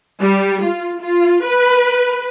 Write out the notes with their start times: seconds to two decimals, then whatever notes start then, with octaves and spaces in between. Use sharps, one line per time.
0.20 G3
0.63 F4
1.00 F4
1.44 B4